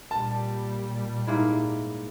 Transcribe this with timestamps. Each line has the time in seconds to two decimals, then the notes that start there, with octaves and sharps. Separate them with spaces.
0.11 A#2 G3 A5
1.27 G#2 A#3 E4